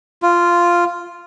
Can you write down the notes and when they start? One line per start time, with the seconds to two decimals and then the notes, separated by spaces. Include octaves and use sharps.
0.22 F4